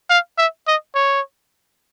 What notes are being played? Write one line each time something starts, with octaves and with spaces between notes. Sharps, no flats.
F5
E5
D#5
C#5